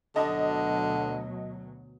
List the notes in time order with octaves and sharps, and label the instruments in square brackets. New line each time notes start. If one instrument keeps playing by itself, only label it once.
[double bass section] D2 B2 F#3 [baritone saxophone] D3 [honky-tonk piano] D#5 A5